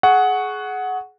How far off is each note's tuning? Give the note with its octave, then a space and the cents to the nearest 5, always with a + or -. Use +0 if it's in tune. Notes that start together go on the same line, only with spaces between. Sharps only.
G#4 +25 F#5 +0 C#6 +0